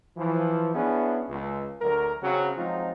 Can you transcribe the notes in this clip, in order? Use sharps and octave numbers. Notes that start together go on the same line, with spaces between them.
E3 F3
B3 C#4 D4 E4 G#4
C#2
D2 F#3 A#4
C#3 F#3 C4
F3 F#3 G#3 C4 D#4 F4